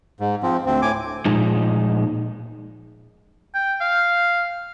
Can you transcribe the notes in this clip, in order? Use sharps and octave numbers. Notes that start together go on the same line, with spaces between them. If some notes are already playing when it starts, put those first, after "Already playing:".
G#2
F3 C4
D2 C4
A2 G#5 D6
A#2 F3 G#3 D#4
G5
F5